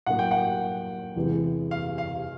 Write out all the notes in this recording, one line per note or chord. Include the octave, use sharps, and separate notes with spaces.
A2 F#3 A#3 F#5
G5
F#5
E2 C3 E3 G#3 B3
F5
F5